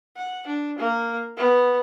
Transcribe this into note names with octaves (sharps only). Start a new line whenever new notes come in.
F#5
D4
A#3
B3